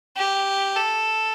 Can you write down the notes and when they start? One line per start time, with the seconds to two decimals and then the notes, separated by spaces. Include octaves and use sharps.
0.17 G4
0.76 A4